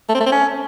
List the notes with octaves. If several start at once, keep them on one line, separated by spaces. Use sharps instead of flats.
A3
C4
A3
C4
C#4